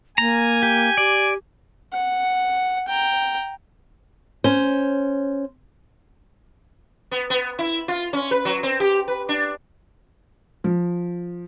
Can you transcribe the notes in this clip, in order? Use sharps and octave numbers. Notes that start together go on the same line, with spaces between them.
A#3 G#5 A#5
G4
G4 D5
F#5
G5 A#5
C#4 C5
B3
B3
E4
F4
C#4
B4
F#3
C4
G4
B4
D4
F3